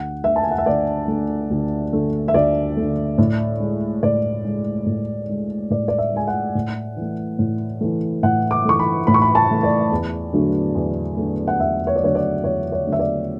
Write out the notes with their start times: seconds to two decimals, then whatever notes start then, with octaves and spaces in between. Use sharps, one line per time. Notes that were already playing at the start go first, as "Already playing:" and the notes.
Already playing: D2 F#5
0.24 D3 A3 E5
0.36 A5
0.43 G#5
0.51 F#5
0.58 E5
0.66 D2 D5
1.08 D3 A3
1.50 D2
1.92 D3 A3
2.28 E5
2.34 D2 D5
2.77 D3 A3
3.18 A2
3.60 G#3
4.03 A2 D5
4.45 G#3
4.86 A2
5.29 G#3
5.70 A2 D5
5.88 D5
5.98 E5
6.13 G#3 G#5
6.28 F#5
6.55 A2
6.97 E3 A3
7.39 A2
7.81 E3 A3
8.23 A2 F#5
8.51 D6
8.65 E3 A3 C#6
8.79 B5
9.07 A2 B5
9.14 C#6
9.22 B5
9.35 A5
9.49 E3 A3
9.63 D5
9.92 E2
10.33 D3 F#3 A3
10.75 E2
11.17 D3 F#3 A3
11.48 F#5
11.60 E2 E5
11.87 C#5
11.96 D5
12.02 D3 F#3 A3 C#5
12.15 D5
12.43 E2 C#5
12.72 C#5
12.86 D3 F#3 A3
12.92 E5
12.99 D5